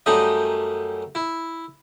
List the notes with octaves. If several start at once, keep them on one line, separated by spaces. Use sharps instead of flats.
F#2 G3 A3 D#4 D#6
E4